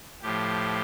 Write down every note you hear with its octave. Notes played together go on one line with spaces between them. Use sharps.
A2 F3 G4